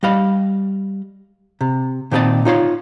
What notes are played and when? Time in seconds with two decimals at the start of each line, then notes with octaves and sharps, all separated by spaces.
0.03 G3 D#5 F5 B5
1.61 C3
2.11 A#2 D#3 C4 A#4 D#5 A5
2.45 D#4 F4 C#5 C6